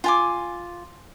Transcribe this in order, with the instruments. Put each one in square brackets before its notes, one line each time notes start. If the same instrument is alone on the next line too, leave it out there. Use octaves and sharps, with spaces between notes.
[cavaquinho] F4 G#5 D6